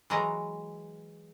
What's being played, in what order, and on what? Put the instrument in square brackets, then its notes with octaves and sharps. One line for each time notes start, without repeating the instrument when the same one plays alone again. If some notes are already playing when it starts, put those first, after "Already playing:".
[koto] E3 F#3 G#3 A#5